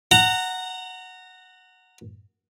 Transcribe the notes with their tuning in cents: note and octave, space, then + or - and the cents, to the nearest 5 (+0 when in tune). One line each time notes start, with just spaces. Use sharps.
F#5 +0 A#5 -25